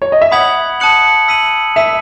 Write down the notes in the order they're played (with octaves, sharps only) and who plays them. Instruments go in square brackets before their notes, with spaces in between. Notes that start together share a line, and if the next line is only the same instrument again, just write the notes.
[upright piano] C#5
D#5
E5
[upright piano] F#5 [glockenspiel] B5 D#6 G#6 B6 F#7
[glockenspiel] A5 D#6 F#6 C#7 F#7
E6 B6 D#7 F#7
[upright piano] E5 [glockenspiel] E6 B6 D#7